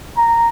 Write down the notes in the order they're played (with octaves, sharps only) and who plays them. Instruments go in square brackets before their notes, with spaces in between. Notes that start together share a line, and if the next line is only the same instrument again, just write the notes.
[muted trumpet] A#5